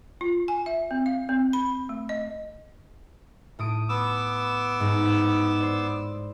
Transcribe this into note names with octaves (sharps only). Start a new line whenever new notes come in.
F4
G#5
E5
C4
F5
C4
B5
A3
D#5
A2 D#6 D7
B3 D6 E6
G#2
C5 D5